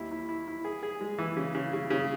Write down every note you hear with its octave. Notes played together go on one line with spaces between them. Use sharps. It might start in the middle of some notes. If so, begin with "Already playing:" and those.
Already playing: D#2 E4
E4
E4
E4
G#4
G#4
G#3
E3
C#3
C#3
C#3
C#3